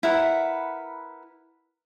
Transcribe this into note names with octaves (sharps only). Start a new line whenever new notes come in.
E4 A#4 B4 F#5